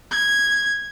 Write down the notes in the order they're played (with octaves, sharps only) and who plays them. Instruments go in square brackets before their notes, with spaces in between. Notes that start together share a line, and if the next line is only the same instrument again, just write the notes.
[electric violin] G#6